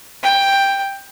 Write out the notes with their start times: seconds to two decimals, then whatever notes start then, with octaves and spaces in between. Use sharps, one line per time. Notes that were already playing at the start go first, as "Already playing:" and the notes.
0.23 G5